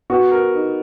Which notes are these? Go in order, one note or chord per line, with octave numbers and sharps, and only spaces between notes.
B3 F#4
A#4
D#4